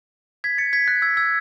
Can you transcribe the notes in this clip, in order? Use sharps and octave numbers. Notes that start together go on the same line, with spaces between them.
G#6 B6
A6 C#7
G#6 B6
F#6 A6
E6 G#6
E6 G#6